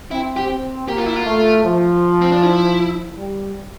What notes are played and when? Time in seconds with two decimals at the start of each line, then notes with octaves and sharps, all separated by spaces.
0.11 C4 E4
0.37 G4
0.49 C4
0.88 A#3 G4
0.97 F4
1.06 E4
1.15 F4
1.26 A3
1.65 F3
2.22 C4
2.32 D4
2.42 E4
3.18 G3